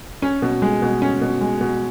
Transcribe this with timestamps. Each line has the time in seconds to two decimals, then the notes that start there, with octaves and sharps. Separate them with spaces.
0.22 C#4
0.42 B2
0.62 G#3
0.82 B2
1.02 C#4
1.21 B2
1.41 G#3
1.61 B2